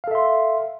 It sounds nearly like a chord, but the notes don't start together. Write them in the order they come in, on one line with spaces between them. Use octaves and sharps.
F5 A4 E5 C6